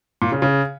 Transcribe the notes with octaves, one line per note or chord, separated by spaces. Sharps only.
A#2
C#3
C#3